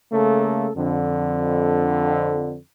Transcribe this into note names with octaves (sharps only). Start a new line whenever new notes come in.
C#3 A3 A#3 A4
F2 D3